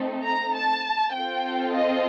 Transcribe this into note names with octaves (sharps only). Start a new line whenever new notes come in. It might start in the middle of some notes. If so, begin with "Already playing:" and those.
Already playing: A3 C4 D#4 A4
A#5
A5
C4 F4 A4 G5
D#5